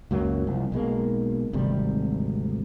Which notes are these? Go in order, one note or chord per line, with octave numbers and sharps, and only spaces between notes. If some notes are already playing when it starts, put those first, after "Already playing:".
C#2 F#2 F#3 A#3
C2 F3
B1 B2 G#3 A#3
G#1 D2 C3 G3